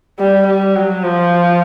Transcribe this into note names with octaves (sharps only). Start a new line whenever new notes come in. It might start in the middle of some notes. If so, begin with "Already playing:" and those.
G3
G3
F#3
F3